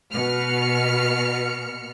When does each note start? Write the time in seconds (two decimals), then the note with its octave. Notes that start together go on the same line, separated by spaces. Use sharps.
0.12 B2 F6 C#7